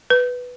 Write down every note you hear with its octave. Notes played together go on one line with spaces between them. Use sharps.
B4